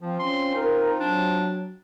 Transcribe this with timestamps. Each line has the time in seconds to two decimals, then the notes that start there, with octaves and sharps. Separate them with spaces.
0.01 F3 C4 F4
0.20 C#4 C6
0.55 D#4 A#4
1.00 F#3 D4